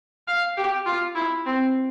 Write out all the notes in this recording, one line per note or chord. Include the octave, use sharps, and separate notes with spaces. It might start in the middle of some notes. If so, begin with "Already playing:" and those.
F5
G4
F4
E4
C4